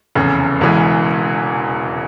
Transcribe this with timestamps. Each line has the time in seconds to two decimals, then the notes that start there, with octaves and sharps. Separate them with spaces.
0.15 F1 E2 C#3
0.60 E1 E2 C#3 E3 G#3